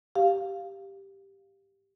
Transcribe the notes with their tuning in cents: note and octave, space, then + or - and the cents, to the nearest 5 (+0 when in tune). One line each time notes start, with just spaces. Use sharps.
G4 +0 F5 +0